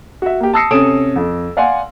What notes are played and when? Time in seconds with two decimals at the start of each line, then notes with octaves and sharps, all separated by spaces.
0.22 F#4 E5
0.40 A#3 G4
0.53 A5 D#6 E6 A#6 C7 C#7
0.71 C3 C#4 A4 D#6 D7 E7
1.16 F2
1.57 D5 F5 F#5 G#5 C6